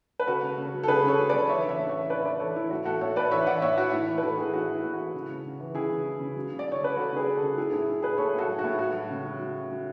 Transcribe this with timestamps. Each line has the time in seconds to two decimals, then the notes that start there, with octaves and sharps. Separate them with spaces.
0.20 B4
0.27 C#3 F#4 A4
0.43 C#3
0.58 C#3
0.74 F#3
0.83 A4
0.88 C#3 G#4 B4
1.04 C#3 A4 C#5
1.19 F#3
1.29 C#3 B4 D5
1.49 E3 C#5 E5
1.64 E3 C#5 E5
1.79 A2
1.89 C#5 E5
1.95 E3
2.09 E3 B4 D5
2.20 E5
2.25 E3 B4 D5
2.40 E3 A4 C#5
2.55 E3 E4
2.71 A2 F#4
2.85 A2 F#4 A4
3.01 A2 A4 C#5
3.16 A2 B4 D5
3.31 E3 C#5 E5
3.47 E3 D5 F#5
3.62 A2 C#5 E5
3.77 E3 F#4
3.93 A2 E4
4.08 E3
4.18 B4
4.23 E3 F#4 A4
4.38 E3 E4 G#4
4.53 A2 F#4
4.69 E3
4.74 E4
4.84 A2
4.94 F#4
4.99 A2
5.14 C#3
5.29 C#3
5.44 C#3
5.60 E3
5.75 C#3 E4 G#4
5.90 C#3
6.05 C#3
6.20 C#3
6.36 F#3
6.52 C#3
6.59 D5
6.66 C#3
6.72 C#5
6.82 C#3 B4
6.96 C#3 F#4 A4
7.12 C#3 G#4 B4
7.27 F#3
7.37 F#4 A4
7.42 C#3
7.58 F#3 E4 G#4
7.73 A2 E4 G#4
7.88 F#3
8.02 F#3 G#4 B4
8.18 A2 A4 C#5
8.34 A2 F#4 A4
8.48 F#3
8.59 F#4
8.64 A2
8.79 F#3 F#4
8.94 F#3
9.10 C#3
9.25 F#3
9.39 F#3
9.56 F#3
9.71 F#3